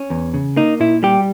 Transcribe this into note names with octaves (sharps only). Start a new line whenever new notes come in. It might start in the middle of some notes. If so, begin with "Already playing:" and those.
Already playing: C#4
E2
C#3
A#3 D#4
A#2 E4
G3 G4